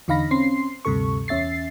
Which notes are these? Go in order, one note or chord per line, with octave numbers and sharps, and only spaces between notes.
E2 D3 D#4 F5 B5 A#6
C4 C#4 C6 C7
D2 G2 C3 A4 C#6
E2 C#4 E5 A6 C7